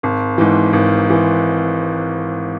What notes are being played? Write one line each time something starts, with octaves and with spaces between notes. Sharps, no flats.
G#1
G#2 E3
G#1
E3